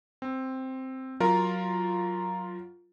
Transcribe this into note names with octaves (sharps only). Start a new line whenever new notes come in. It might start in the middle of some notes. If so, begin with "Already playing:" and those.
C4
F#3 F4 A#4